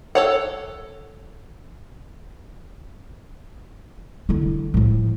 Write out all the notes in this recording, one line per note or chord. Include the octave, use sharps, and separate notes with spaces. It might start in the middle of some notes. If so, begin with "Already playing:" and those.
A4 C#5 F#5
D3 E4
A2 F3